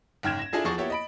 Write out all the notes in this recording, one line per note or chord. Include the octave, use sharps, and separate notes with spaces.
F#1 G#2 G5 F6 G#6 E7
A#6 E7
D4 E4 F4 G#4 A4
E2 F3 G#4 C#6 A6
A#3 B3 E4 G4 C#5
D#5 B5 D7